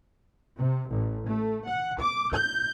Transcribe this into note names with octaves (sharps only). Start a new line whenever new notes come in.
C3
A1
A3
F#5
D6
G6